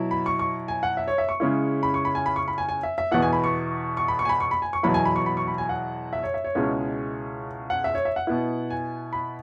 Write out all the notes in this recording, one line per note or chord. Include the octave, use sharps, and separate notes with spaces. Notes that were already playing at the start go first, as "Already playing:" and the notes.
Already playing: B2 F#3 E4
B5
C#6
C#6
G#5
F#5
E5
C#5
E5
C#6
C#3 G#3 C#4 E4
B5
C#6
B5
G#5
B5
C#6
B5
G#5
G#5
E5
E5
E2 B2 B3 E4 F#5
G#5
B5
C#6
C#6
B5
C#6
G#5
B5
C#6
B5
G#5
C#6
E2 B2 F#3 E4 B5
G#5
B5
C#6
B5
C#6
B5
G#5
F#5
E5
C#5
E5
C#5
C#2 B2 G#3 C#4 E4
F#5
E5
C#5
E5
F#5
B2 B3 E4
G#5
B5